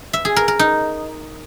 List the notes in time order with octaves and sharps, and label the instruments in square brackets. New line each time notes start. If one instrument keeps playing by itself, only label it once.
[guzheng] E5
G#4
A#4
A#4
D#4